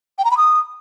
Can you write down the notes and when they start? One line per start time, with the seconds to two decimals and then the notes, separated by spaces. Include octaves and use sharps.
0.18 G5
0.25 A#5
0.31 B5
0.37 D#6